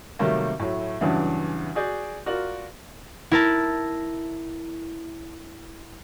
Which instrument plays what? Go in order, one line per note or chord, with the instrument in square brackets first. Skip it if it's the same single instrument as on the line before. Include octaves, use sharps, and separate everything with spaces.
[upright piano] C3 D#3 F#3 G3 A3 A#3
A2 F#3 A3
E2 G2 C#3 E3 F#3 D4
F#4 G#4 D5 G6
F4 F#4 A#4 D5 F#7
[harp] E4 A#4 A5